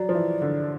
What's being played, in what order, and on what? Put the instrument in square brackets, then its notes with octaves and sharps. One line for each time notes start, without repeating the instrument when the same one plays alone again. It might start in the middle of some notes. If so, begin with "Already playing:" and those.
Already playing: [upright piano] F#3 [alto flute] D5
[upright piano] F3
E3
D3